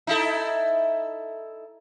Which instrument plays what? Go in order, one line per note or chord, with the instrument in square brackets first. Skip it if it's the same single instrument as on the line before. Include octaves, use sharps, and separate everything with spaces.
[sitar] D#4 E4 A4